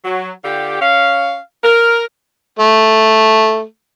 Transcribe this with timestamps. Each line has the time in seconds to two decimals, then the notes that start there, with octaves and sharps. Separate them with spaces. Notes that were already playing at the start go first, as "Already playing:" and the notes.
0.05 F#3
0.44 D3 F4 G4
0.81 C#4 F5
1.64 A#4
2.59 A3